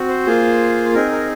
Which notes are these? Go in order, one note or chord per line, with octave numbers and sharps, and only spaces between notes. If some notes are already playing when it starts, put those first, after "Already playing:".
Already playing: C4 F#4
C5
A#3 F4 G#4
C4 D#4 G#4 A#4
A#4